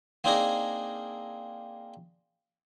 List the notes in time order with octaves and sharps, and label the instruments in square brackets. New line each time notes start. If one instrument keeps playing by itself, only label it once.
[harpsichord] A#3 C4 D4 D#4 G#4 A#4